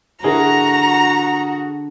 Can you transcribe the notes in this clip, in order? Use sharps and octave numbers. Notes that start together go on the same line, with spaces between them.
D3 E4 F#4 G#4 A#4 A#5